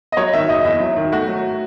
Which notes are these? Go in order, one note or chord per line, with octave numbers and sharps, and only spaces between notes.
D#5
F#3 C#5
D#3 E5
F#1 D#5
E2 E5
F#3
D#3
A3 F#4
F#3